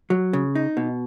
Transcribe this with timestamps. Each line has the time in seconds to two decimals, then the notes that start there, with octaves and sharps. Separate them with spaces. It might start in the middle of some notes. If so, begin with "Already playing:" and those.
0.10 F#3
0.33 C#3
0.55 D#4
0.77 B2